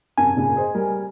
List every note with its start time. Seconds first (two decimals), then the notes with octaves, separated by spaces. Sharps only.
0.18 F#2 C3 G#5 A5
0.36 F#2 A#2 C#3
0.56 G#4 C5 D#5
0.74 G3 A#4